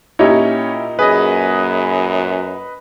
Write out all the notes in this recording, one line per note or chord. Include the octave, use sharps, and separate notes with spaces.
A#2 C#4 D#4 E4 G4 C#5
F#2 G#4 B4 D#5